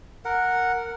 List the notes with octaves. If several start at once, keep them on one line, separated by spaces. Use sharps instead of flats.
A#4 F#5